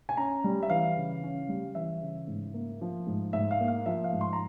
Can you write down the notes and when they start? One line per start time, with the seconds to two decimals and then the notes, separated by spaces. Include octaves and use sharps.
0.09 G#5
0.17 C#4 A#5
0.44 G3
0.63 E5
0.70 E3 F5
0.96 C#3
1.23 C#4
1.49 G3
1.75 E3 E5
2.02 C#3
2.27 G#2
2.54 A#3
2.81 F3
3.07 G#2
3.33 G#2 E5
3.51 F5
3.60 A#3
3.68 F5
3.86 F3 E5
4.04 F5
4.12 G#2
4.21 C6
4.33 A#5